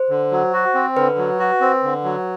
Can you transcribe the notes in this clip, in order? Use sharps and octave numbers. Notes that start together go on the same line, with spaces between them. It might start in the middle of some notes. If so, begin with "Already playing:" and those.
Already playing: C5
D3
F#3
F#4
C4
D3 B4
F#3
F#4
C4
D3
F#3